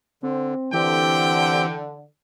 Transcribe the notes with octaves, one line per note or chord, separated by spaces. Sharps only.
D3 C4
D3 E3 C4 G4 G5